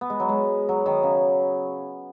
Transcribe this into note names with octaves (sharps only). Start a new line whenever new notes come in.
B3
G#3
F#3
G#3
F#3
D#3
C#3